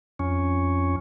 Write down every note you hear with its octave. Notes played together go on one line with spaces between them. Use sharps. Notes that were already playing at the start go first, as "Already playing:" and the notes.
F2 C#4